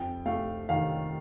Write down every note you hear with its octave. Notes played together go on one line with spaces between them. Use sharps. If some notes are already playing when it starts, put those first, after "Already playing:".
Already playing: F2 G5
A3 F5
D#3 F5